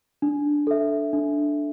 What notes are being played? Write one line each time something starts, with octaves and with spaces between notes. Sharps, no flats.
D4
A4 E5
D4